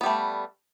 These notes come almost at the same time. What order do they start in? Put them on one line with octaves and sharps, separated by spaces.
B3 G3 A3